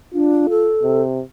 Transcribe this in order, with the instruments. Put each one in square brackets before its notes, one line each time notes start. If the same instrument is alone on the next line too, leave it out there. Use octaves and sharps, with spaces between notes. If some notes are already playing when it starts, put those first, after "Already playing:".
[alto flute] D4 [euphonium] F4
[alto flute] A4
[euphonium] C3